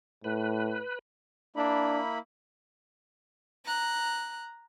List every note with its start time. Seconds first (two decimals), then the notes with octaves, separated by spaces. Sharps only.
0.24 A2 B4
1.56 A#3 D4 E4 B5
3.65 A#5 F#6